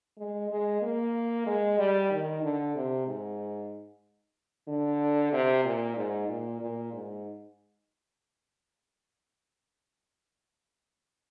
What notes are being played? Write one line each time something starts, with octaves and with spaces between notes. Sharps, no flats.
G#3
G#3
A#3
G#3
G3
D#3
D3
C3
G#2
D3
C3
A#2
G#2
A#2
A#2
G#2